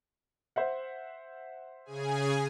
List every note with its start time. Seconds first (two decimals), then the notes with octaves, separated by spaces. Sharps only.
0.56 C5 E5 F#5
1.85 C#3 G#4 G#5